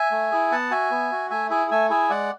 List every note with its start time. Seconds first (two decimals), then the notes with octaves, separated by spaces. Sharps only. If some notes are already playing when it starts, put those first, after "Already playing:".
Already playing: E5 G#5
0.11 A3
0.31 E4 G#4
0.51 B3 F#5 A5
0.71 F#4 E5 G#5
0.91 B3
1.12 F#4
1.30 A3 E5 G#5
1.50 E4 G#4 E5 G#5
1.71 A3 E5 G#5
1.90 E4 G#4 E5 G#5
2.10 G#3 D5 F#5